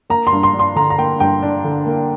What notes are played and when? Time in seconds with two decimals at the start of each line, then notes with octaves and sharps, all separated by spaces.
0.10 A#3 A#5
0.27 C6
0.32 G2
0.43 C6
0.54 D4
0.59 C6
0.76 D3 A#5
0.90 A#5
0.98 A#3 G5
1.20 G2 G5
1.43 D4
1.64 D3
1.86 A#3